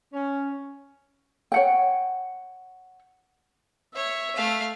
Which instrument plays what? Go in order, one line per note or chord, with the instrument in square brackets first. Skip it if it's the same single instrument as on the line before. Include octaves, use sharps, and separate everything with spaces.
[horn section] C#4
[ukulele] C#5 F#5 G5
[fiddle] C#5 [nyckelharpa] E5
[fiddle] A3 F5